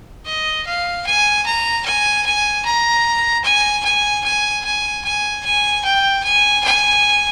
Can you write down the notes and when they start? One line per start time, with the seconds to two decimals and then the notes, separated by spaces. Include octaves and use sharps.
0.26 D#5
0.66 F5
1.06 G#5
1.46 A#5
1.85 G#5
2.26 G#5
2.65 A#5
3.44 G#5
3.84 G#5
4.24 G#5
4.64 G#5
5.04 G#5
5.45 G#5
5.84 G5
6.24 G#5
6.64 G#5